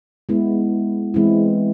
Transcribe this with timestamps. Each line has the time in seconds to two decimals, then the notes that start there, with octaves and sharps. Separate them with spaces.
0.29 G#3 B3 E4
1.14 E3 G#3 C4 E4